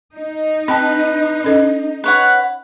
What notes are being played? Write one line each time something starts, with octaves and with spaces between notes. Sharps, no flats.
D#4
C4 B4 G5 A5
C#4 A4 D#5
B4 C#5 F#5